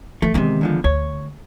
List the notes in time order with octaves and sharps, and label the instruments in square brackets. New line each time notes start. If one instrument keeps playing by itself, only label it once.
[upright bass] E3 [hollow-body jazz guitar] A3
[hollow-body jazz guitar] E2 C3 [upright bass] D#3 G#3
[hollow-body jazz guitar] E2 D3 F3
[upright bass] D2 [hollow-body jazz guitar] C#5